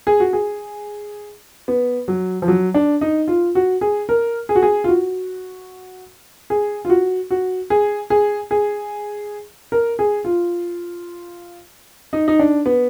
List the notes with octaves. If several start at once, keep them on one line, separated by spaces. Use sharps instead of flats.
G#4
F#4
G#4
B3
F#3
F3
F#3
D4
D#4
F4
F#4
G#4
A#4
G#4
F#4
G#4
F4
F#4
G#4
F4
F#4
F#4
G#4
G#4
G#4
A#4
G#4
F4
D#4
D#4
D4
B3